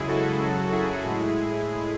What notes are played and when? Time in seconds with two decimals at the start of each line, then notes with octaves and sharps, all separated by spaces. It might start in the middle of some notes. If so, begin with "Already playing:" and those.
Already playing: F#2 C#3 G#3 E4 G#4
0.08 F#4 A4
0.40 F#2 C#3 F#3
0.72 E4 G#4
1.04 A2 G#3